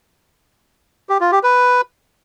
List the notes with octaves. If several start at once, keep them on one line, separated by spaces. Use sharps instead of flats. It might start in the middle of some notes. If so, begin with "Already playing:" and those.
G4
F4
G4
B4